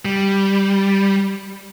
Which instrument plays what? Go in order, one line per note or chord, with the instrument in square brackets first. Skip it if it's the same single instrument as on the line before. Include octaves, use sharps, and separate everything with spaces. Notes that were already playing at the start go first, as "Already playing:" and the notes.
[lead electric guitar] G3